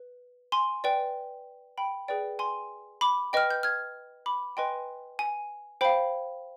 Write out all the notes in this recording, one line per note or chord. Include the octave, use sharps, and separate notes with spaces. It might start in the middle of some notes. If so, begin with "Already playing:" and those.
Already playing: B4
G#5 C6
B4 D5 G5
G5 B5
G#4 B4 D5 G5
G#5 C6
B5 D6
B4 D#5 G5 F6
G6
F6 G#6
B5 D6
B4 D#5 G5 G#5 C6
G#5
C5 F5 G5 B5